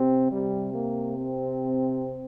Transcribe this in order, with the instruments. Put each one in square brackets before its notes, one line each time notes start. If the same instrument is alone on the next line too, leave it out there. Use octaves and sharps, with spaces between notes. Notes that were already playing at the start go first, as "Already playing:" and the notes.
Already playing: [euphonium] C3 [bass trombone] C4
[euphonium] C3 [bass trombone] G3
[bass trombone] A#3
C4